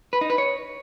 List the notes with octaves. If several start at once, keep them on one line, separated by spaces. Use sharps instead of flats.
B4
D#4
B4
C#5